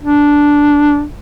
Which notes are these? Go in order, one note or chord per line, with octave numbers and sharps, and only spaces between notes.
D4